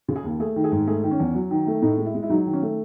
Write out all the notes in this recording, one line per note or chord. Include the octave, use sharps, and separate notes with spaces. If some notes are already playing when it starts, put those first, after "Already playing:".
C#3
G#4
D#2
A3 G#4
D#3
G#4
G#2
A3 G#4
D#3
C#4
E2
F#3
D#3
A3
A2 D#4
G#3
E4
G#3
E4
F#3 D#4
D#3
C#4
A3